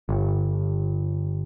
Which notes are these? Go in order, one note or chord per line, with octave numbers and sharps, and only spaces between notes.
G1